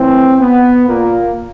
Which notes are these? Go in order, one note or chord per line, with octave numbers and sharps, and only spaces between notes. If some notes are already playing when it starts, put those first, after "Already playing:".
Already playing: A2 E3 C4
B3
A#2 A#3